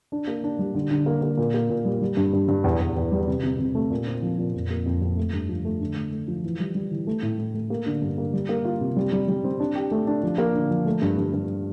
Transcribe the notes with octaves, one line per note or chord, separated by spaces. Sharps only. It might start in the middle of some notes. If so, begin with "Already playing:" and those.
D4
A#3
D4
G3
D3
D3
A#3
A#3
A#2
A#3
A#2
G3
G3
G2
G2
G2
E2
E2
E2
G3
C3
C3
C3
A3
A#2
C4
F3
A#2
F2
A#3
F2
F2
A3
G2
F3
A3
D3
A3
A3
F3
E3
G3
G3
E3
A3
A2
A3
A3
A#3
D3
G2
A#3
G3
A#3
F4
C3
G3
G3
G3
C4
D4
G4
A3
D4
F3
A#3
D3
F3
A3
G2
G2
G2